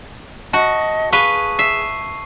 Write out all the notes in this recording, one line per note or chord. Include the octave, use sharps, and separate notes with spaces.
F#4 D#5 A5
G#4 B4 F5 C#6 D#7
E5 C7